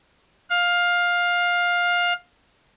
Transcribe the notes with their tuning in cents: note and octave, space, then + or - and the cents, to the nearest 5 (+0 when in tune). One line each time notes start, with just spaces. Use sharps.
F5 +15